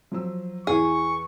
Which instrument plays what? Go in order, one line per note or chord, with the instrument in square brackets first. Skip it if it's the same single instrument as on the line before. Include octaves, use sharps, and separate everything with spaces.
[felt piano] F3 F#3 E6
[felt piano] E2 E3 [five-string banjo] G#4 [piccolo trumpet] C#6